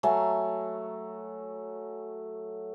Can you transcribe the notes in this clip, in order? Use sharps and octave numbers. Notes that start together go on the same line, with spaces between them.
F#3 A3 G#5